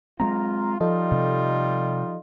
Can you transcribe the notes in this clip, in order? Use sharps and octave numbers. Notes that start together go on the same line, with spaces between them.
F#3 G#3 C4 F4 A#5
F3 G3 D#4 F4 A4 D#5
C3